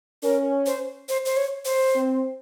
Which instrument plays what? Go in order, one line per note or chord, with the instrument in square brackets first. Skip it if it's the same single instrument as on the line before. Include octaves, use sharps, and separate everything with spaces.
[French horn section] C#4 [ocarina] A#4
[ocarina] C5
C5
C5
C#5
C5
[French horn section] C4